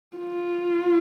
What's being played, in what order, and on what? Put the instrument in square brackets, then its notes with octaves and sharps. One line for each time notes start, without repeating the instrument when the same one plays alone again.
[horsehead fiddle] F4